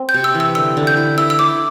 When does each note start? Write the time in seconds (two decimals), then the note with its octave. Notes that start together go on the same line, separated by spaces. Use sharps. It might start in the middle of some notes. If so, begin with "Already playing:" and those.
Already playing: C4
0.09 G6
0.14 C3
0.24 E6
0.34 E3
0.40 E6
0.55 D3 E6
0.77 D3
0.87 G6
0.97 E4
1.18 E4 E6
1.30 E6
1.39 E4 D6